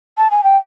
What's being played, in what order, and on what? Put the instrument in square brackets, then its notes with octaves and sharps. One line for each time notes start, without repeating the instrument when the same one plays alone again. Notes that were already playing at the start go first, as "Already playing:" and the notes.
[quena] A5
G#5
G5